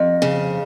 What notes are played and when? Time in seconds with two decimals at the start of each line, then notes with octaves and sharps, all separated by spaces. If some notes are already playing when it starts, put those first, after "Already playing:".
Already playing: F2
0.22 C#3